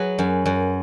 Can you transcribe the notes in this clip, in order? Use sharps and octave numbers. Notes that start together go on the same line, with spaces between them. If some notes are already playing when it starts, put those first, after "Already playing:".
Already playing: F#3 G#4 B4
F#2
F#2